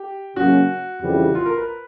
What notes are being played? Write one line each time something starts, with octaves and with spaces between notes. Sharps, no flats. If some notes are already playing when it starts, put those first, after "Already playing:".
Already playing: G4
C#3 F#3 A#3 C#4 F#4
F2 C#3 E3 G3
F4
A#4
B4